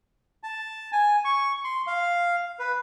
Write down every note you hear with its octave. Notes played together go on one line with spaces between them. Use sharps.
A5
G#5
C#6
C6
F5
B4